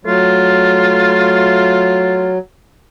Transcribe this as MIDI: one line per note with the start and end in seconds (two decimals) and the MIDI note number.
0.05 2.38 54
0.05 2.33 57
0.05 2.33 65